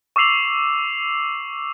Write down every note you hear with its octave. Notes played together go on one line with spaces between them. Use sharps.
C#6 D6 E6 C7 F7 F#7